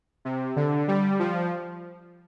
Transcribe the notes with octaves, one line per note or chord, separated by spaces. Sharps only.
C3
D3
G3
F3